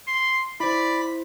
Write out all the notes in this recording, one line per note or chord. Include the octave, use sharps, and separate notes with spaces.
C6
E4 C5 D5 B5